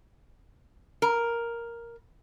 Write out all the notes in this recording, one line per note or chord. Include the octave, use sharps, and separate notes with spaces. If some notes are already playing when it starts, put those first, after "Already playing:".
A#4